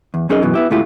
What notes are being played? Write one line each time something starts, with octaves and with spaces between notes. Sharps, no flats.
E2
F#2 C#4 D#4 G#4 A#4 D#5
F#2 B2 E3
B3 E4 G4
D2 G#2 A3 E4 F4 G4